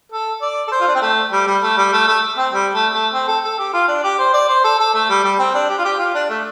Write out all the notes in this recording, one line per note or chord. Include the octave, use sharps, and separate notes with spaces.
A4
D5
A4
C5
F4
D4
C4
A3
G3
G3
A3
G3
A3
A3
C4
G3
A3
A3
C4
A4
A4
G4
F4
D4
G4
C5
D5
C5
A4
A4
A3
G3
G3
C4
D4
G4
F4
G4
F4
D4
A3